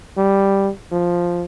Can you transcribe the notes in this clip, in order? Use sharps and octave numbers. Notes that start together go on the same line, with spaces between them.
G3
F3